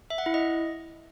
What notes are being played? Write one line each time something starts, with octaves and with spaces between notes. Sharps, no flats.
E5
F#5
E4
D#5